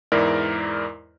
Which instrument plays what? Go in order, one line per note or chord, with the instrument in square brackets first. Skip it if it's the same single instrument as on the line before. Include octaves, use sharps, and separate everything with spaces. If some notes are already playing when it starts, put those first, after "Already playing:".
[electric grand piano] E2 G#2 E4 A#4 D5